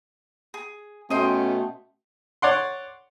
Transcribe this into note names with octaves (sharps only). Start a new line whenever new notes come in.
G#4
B2 A3 C#4 F#4 D#5 G5 C6
C#5 D5 F#5 C6